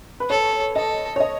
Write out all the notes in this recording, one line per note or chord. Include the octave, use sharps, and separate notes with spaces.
B4
A4 C#5
A4 D#5
C#5
D#5